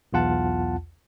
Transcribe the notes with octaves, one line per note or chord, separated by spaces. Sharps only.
B1 E2 F4 F#5 A5